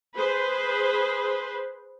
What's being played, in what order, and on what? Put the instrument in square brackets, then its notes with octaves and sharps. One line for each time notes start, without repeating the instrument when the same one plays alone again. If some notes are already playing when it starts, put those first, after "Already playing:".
[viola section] G#4 B4 C5